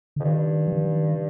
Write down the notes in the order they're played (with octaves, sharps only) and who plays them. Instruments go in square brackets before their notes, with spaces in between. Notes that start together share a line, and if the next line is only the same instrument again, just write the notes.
[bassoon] F2 [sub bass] D3
[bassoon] G2 [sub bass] D#3
[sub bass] F3
D#3